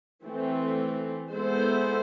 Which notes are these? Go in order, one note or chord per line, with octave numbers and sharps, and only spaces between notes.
E3 A3 C4
G#3 B3 E4 A4 C5